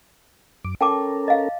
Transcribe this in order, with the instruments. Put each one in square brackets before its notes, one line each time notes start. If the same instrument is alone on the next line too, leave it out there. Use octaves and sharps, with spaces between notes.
[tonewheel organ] F#2 D6
[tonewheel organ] C#4 A4 A#4 [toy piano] G5 A5 D6
[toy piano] D#5 F5